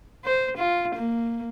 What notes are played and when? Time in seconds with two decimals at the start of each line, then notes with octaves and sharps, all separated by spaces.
0.25 C5
0.57 F4
0.95 A#3